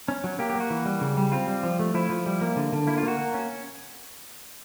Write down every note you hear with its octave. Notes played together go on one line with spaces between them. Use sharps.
C#4
F#3
A#3 G4
G4
A#3
F#4
E3
G3
C#3
G3
C4 F4
G3
F3
A3
F3 E4
F3
G3
A#3
D3
D3
A#3 E4
F4
A#3 F#4
A#3
C#4